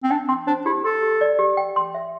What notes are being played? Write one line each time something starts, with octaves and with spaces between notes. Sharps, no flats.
C4
D4 G5
C4 C6
D4 C5
E4 G4
A4 C6
G4
D5
G4
G5
C6
E5